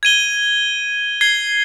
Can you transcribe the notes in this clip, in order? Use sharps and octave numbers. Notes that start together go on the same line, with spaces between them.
G#6 D#7 G7
G#6 C7 G7